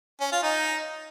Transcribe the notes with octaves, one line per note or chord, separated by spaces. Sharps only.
C#4
F4
D#4